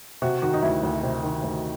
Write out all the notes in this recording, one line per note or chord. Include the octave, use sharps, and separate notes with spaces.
C3 F#4
D#3 F#4
D#4
D2 E4
D2
C3
D#3
D2